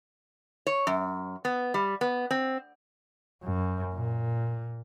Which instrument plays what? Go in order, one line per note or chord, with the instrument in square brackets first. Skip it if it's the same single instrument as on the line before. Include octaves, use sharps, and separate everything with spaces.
[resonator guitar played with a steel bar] C#5
F#2
B3
G3
B3
C4
[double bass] F#2
A#2